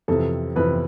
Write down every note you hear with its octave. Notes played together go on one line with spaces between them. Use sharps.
F2 C3 E3 A4
F2 C3 E3 B4